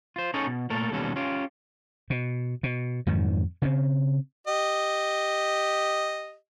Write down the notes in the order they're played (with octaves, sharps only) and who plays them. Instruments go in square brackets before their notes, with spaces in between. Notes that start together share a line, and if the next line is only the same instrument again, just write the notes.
[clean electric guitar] F4 C5
C#4 D#4 G#4 A4 C#5
B2
A#2 A3 A4 A#4
D#2 B2 G3 C#4 A4
C#4 F4 G4
[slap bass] B2
B2
F2 G#2 D#3 F#3
C#3 A#3 C4
[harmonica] G4 D#5